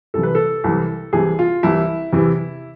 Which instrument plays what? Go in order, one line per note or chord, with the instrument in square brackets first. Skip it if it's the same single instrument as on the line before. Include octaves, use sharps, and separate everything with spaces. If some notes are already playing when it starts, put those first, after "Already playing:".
[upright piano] C2 C3 E3 A4
B4
A4
C2 C3 E3
C2 C3 E3 G#4
F4
C2 C3 E3 E4
E2 C3 E3